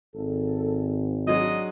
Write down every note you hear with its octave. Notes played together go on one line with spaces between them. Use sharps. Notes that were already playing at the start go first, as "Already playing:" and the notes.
G#1 A4
F#3 G#3 D4 D#5